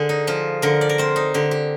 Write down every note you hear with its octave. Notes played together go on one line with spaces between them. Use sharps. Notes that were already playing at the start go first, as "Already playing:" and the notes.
Already playing: D3 G#4 A#4 C5
D#4
F3 F4
D3 A#4
D5
A#4
C4 C5
D#4
D3 G4
G4